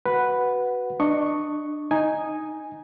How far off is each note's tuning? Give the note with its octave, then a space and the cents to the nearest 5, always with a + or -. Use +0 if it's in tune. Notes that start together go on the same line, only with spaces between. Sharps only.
F#4 +10 B4 +0 F#5 +0
D4 +20 D#5 +0 C#6 +0
D#4 +0 G#5 +0